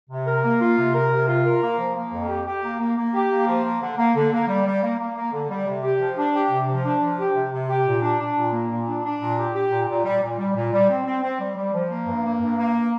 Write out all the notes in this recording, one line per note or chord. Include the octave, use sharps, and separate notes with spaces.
C3
A#4
A#3
F4
C3
A#4
C3
F4
A#4
A#3
F3
A#3
F2
G4
G4
A#3
A#3
A#3
G4
A#3
F3
A#3
D3
A#3
D3
A#3
G3
G3
A#3
A#3
A#3
D3
G3
C3
G4
F3
D4
G4
C3
F3
D4
F3
G4
C3
C3
G4
A#2
D4
D4
A#2
A#3
A#2
D4
D4
A#2
G4
G4
A#2
A#2
G3
A#2
G3
A#2
G3
C4
C4
C4
G3
G3
F3
A#3
G2
A#3
G2
A#3